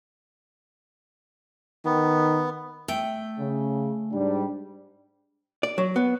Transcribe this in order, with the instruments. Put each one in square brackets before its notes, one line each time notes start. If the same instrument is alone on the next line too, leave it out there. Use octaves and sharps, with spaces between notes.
[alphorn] D#3 [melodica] B3
[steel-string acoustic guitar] A3 G5
[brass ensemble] C#3
G#2 G3 D4
[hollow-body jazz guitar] D5
F#3
B3